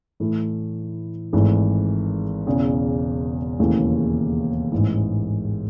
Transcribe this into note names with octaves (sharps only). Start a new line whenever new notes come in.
A2 E3 A3 E4
G#1 G#2 E3 A3
E1 E2 C#3
E1 D#2 C#3 E3 A3
A1 G#2 E3